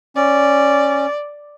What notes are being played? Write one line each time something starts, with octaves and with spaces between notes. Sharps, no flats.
C#4 D5